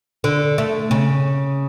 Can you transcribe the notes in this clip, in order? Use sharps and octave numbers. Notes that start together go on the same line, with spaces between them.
D3
A3
C#3